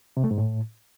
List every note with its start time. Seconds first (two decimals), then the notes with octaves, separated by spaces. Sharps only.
0.17 C3
0.24 A3
0.31 G#2
0.38 A2